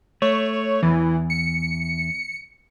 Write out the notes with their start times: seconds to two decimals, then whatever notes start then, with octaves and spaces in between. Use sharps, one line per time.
0.22 A3 C#5
0.83 E2 E3
1.30 C#7